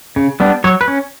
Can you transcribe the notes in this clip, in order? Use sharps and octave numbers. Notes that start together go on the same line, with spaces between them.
C#3
G3 B3 D4
F#3 C#5
B4
C#4